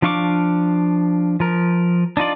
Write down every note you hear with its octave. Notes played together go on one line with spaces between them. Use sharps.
F3 D4 F5 C#6 D6
F3 A#4
D4 D#4 F4 D5